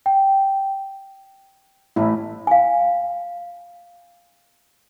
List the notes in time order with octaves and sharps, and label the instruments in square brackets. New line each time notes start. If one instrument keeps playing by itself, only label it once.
[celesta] G5
[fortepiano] A1 A2 [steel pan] E4
[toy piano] F5 G#5